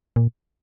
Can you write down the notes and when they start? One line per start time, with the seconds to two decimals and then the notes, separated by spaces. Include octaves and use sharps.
0.16 A#2